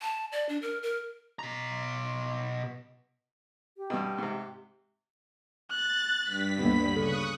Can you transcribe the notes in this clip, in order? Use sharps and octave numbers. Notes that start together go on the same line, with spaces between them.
A5
D5
D4
A#4
A#4
B2 A#5
G4
G2 B2
G#2 C3
F#6 A6
G2 B6
G1 D2 G3 A#3 B3 D4 B5
C#3 A4 C#6 D#6 F#6